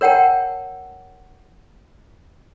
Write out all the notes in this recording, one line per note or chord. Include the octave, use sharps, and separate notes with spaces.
A#4 C#5 F#5 G5 A5